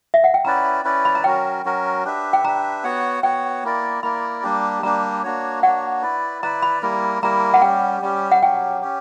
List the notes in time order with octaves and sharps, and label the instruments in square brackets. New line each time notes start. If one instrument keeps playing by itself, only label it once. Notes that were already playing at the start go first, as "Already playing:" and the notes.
[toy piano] E5
F#5
G5
[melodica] C#4 E4 B4 D5 [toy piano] A#5
[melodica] C#4 E4 B4 D5
[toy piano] B5
A#5
[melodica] F#3 C#4 F#4 A#4 [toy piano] G5
[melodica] F#3 C#4 F#4 A#4
D4 G4 B4 E5
[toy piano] G5
[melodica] D4 G4 B4 E5 [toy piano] A#5
[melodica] B3 F#4 C#5 F#5
[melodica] B3 F#4 C#5 F#5 [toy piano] G5
[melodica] A#3 E4 A#4 D5
[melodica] A#3 E4 A#4 D5 [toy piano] B5
[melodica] G3 A#3 D4 G4
[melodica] G3 A#3 D4 G4 [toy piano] A#5
[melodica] A#3 D4 F#4 C#5
[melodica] A#3 D4 F#4 C#5 [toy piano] F#5
[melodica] E4 B4 D5
[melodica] E4 B4 D5 [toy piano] A#5
[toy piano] B5
[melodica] G3 A#3 E4 A#4
[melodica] G3 A#3 E4 A#4 [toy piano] A#5
[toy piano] F#5
[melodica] G3 C#4 G4 [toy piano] G5
[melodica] G3 C#4 G4
[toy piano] F#5
[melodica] F#3 C#4 G4 [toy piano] G5
[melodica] C#4 G4